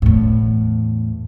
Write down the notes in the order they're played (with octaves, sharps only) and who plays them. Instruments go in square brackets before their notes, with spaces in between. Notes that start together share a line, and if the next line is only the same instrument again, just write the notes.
[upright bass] E2 A2